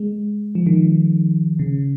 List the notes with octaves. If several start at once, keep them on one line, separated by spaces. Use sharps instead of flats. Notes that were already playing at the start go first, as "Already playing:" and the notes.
Already playing: G#3
F3
D#3
C#3